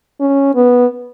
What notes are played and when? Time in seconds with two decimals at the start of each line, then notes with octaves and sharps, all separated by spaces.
0.20 C#4
0.55 B3